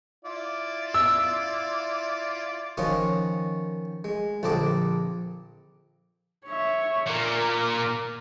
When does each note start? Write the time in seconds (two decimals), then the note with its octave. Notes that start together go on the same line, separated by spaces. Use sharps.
0.25 E4 F4 D5
0.94 E6
2.77 D#3 F3 C#4 F4 F#4 D#5
4.04 G#3
4.43 A#1 D3 C4 A4 D#5 D6
6.47 C#5 E5
7.07 A#2 A#4